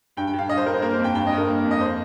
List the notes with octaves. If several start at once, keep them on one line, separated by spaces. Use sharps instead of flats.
G2 G5
G5
G2
F5
G2 D#5
C5
G2 A#4
C5
A#3 A#4
C5
F2
G5
G2 G5
D#5
G2 A#4
A#3
F2
D#5
C5